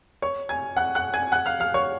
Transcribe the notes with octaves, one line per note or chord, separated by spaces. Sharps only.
C#5 C#6
G#5 G#6
F#5 F#6
F#5 F#6
G#5 G#6
F#5 F#6
F5 F6
F5 F6
C#5 C#6